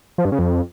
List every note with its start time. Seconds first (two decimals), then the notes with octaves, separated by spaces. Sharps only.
0.18 F3
0.25 G2
0.32 C#3
0.39 F2